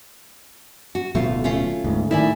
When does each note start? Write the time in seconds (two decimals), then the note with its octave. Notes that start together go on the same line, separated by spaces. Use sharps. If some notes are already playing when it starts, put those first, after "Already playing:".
0.95 F#4
1.15 D1 B2 F#3 A3 F4
1.44 A3 C#4 F4
1.84 D2 G#2
2.11 A2 D#3 E4 D5 G#5